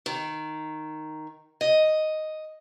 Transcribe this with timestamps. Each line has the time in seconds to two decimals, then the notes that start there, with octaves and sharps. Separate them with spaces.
0.06 D#3
1.61 D#5